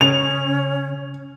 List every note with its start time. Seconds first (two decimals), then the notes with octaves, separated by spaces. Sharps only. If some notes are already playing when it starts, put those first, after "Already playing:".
0.01 C#3 C#4 F7